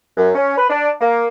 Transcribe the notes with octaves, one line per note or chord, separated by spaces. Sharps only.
F#2
C#4
B4
D4
A#3